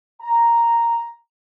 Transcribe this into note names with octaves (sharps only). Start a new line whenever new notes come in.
A#5